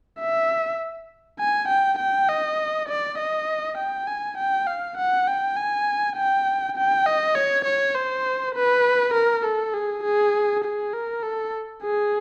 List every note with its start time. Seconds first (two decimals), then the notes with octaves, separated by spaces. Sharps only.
0.20 E5
1.39 G#5
1.68 G5
1.98 G5
2.29 D#5
2.88 D5
3.19 D#5
3.78 G5
4.07 G#5
4.38 G5
4.67 F5
4.97 F#5
5.27 G5
5.56 G#5
6.16 G5
6.76 G5
7.06 D#5
7.35 C#5
7.65 C#5
7.95 C5
8.55 B4
9.14 A#4
9.45 A4
9.74 G#4
10.03 G#4
10.64 G#4
10.93 A#4
11.23 A4
11.83 G#4